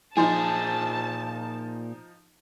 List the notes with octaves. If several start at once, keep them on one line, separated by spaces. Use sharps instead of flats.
A#2 F3 D#4 G#4 G#5 A5 C6